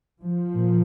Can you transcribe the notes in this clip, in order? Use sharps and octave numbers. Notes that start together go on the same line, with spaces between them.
F3
A#2